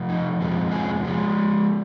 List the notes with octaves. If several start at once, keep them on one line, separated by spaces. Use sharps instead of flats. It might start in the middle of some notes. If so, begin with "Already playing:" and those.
Already playing: F2 C3 F3
D#4
F2 C3 F3 G#3
G#4
F3 G#3